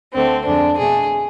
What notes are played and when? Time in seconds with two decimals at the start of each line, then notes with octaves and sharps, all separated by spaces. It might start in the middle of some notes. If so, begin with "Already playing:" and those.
0.15 D2 D3 A3 C4
0.47 F2 D3 G#3 D4
0.79 B2 A3 G#4